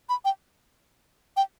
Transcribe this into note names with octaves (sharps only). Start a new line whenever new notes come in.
B5
G5
G5